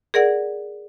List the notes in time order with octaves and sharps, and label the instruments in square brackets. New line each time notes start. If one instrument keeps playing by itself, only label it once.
[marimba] G#4 A#4 D5 F#5